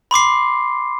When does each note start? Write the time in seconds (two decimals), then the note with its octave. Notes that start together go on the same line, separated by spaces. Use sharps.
0.11 B5 C6 D6 C7